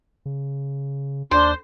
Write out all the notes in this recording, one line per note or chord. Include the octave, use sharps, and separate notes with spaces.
C#3
D#2 D4 C5 C6